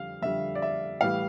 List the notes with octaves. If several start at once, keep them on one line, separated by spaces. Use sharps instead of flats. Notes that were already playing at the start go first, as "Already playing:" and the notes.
Already playing: F2 D3 G3 F5
F2 D3 G3 E5
D5
E5
A2 E3 G3 F5